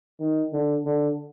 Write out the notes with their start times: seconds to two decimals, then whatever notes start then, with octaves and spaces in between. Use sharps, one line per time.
0.20 D#3
0.53 D3
0.85 D3